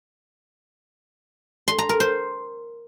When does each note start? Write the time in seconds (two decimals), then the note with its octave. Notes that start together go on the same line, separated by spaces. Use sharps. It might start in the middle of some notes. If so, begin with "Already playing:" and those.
1.68 C6
1.79 A#5
1.89 A#4
2.00 C5